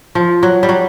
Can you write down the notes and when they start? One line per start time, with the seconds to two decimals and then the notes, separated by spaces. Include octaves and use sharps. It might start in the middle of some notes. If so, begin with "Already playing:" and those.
0.15 F3
0.43 F#3
0.63 G3
0.69 F#3